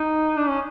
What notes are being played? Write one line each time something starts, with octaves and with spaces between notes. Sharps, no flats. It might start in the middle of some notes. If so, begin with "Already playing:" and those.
Already playing: D#4
D4
C#4